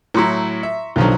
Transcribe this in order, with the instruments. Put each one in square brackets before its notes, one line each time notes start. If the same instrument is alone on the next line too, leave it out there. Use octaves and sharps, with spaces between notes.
[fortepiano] A2 F#3 E4 [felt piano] A#5 C6 C#6
[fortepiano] E5
[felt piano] B1 B2 D3 [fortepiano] D#3 F3 F#3